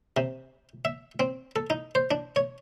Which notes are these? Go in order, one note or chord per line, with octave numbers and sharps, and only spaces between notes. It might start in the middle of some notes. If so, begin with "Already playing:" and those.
C3
E5
C4
A4
D#4
C5
D4
C#5